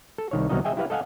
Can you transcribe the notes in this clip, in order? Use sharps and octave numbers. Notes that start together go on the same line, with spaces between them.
A4
C2 D#3 C#5
C2 B2 D#3 F#3 D#4 D#5
G#4 D#5 E5 G5 G#5
E4 G4 B4 F5
A4 D#5 F5 F#5 G#5